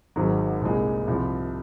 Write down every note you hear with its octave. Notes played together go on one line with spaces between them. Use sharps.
G#1 G#2 F#3
C2 A#2 G#3
C2 C3 F3